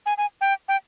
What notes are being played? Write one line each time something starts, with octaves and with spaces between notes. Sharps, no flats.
G#5
G#5
G5
G5